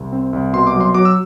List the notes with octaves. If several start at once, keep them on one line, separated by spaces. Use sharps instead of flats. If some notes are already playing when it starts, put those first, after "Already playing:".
Already playing: C2
C4
C2
B2 C6
D6
F#3
C6
F#3 D6
E6